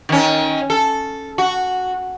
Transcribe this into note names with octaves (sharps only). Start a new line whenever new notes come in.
D#3 C#4
A4
F#4